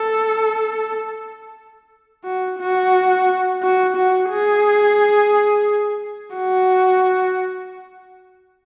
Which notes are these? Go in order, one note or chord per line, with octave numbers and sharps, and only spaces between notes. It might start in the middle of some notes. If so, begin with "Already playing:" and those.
Already playing: A4
F#4
F#4
F#4
F#4
G#4
F#4